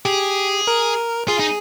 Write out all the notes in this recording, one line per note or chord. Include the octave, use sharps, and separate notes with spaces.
G4 G#4
A#4
F4 G#4
D#4